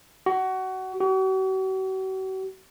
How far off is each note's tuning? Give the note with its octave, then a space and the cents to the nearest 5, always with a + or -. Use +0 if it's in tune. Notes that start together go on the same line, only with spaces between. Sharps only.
F#4 +25
F#4 +45